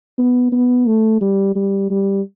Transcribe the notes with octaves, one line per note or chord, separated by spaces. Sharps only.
B3
B3
A3
G3
G3
G3